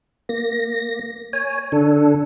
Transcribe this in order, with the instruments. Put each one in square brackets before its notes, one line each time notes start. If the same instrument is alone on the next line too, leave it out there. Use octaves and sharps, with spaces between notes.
[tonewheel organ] A#3 A#6
C#5 G#5
D3 D4 A4